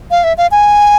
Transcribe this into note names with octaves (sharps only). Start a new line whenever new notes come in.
F5
E5
F5
G#5